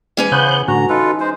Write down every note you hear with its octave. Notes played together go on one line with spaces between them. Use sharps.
E3 G#3 C#4 G#5
C#3 B3 C5 F#6 G6
A2 D3 F#4 A#5
D#4 F4 A4 B4
G#3 C5